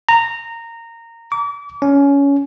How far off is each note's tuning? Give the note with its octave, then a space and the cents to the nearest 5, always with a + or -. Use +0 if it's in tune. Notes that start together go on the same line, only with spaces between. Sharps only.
A#5 -15
D6 -35
C#4 +20